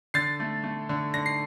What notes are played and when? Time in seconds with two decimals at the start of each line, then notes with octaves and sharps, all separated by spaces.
0.14 D3 A6 C7
0.40 A3
0.64 A3
0.89 D3
1.14 D3 A#6
1.26 C7